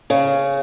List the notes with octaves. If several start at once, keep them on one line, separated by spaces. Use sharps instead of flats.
C#3